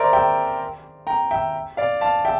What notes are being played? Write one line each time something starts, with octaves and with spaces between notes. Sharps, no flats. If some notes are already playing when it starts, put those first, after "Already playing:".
Already playing: A#4 C5 D5 E5
E5 G5
G5 A#5
E5 G5
D5 F5
F5 A5
E5 G5